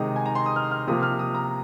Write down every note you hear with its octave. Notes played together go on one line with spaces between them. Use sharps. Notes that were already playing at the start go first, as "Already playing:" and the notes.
Already playing: C3 D#3 G#3 A#5 D#6
G#5
A#5
C6
D#6
F6
F6
C3 F3 A#3 D#6
F6
D#6
A#5